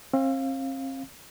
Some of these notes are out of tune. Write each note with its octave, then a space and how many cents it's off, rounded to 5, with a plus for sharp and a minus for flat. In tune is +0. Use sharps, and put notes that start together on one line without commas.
C4 +40 F5 +0